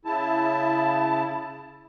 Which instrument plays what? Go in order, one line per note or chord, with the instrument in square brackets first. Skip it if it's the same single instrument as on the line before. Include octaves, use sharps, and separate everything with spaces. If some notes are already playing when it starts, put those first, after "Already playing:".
[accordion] C#3 E4 A5